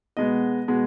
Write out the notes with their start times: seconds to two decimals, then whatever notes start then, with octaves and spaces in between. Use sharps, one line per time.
0.17 B2 G#3 B3 D#5
0.68 B2 G#3 B3